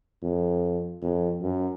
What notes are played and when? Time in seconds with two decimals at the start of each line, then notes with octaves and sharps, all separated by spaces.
0.23 F2
1.02 F2
1.42 F#2